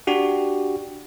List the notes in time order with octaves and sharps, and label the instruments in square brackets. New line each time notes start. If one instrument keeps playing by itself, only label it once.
[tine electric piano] D4 F#4 G4